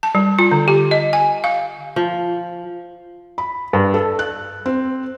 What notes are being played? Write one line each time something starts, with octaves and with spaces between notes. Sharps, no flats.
A5
G3
F4
D3
G4
D#5
G#5
F5
F3
B5
G2
A4
F#6
C4